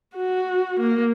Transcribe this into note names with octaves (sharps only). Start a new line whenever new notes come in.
F#4
A#3